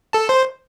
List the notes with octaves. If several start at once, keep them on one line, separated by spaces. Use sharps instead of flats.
A4 A5
C5 C6